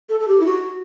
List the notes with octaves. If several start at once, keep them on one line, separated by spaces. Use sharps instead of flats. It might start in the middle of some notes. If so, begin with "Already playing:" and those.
A4
A4
G4
E4
F#4